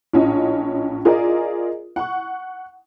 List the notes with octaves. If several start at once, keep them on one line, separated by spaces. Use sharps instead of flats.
A#1 A2 C#4 F4 D#5
F4 G#4 A#4 D5 D#5
F#5 C#6